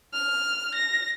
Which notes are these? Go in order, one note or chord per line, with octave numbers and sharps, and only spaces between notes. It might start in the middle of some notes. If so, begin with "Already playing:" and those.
F6
A#6